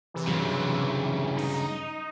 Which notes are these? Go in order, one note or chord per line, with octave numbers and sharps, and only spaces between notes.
C3 E3
G2 C#3 F#3
D#4